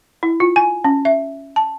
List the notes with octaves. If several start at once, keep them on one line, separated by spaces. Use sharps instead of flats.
E4
F4
G#5
C#4
E5
A5